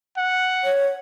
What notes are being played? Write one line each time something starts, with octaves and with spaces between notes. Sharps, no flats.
F#5
C#5